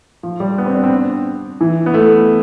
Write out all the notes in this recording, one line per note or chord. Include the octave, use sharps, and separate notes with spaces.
F3
G3
B3
C4
D4
C4
E3
B3
A3